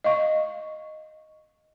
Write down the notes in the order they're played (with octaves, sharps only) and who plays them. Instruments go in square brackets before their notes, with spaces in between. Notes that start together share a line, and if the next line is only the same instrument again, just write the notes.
[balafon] D#5 F5 C#6